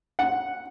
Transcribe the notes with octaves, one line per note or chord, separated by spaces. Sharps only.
F#5